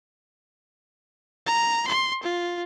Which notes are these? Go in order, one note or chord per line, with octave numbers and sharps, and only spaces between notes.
A#5
C6
F4